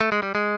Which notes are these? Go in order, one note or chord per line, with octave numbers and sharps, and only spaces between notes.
A3
G#3
G3
G#3